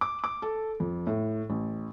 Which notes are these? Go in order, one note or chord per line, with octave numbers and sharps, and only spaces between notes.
D6
D6
A4
F2
A2
A1